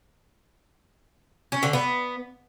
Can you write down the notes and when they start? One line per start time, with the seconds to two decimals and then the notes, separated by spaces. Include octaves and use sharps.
1.52 C#4
1.63 D3
1.73 B3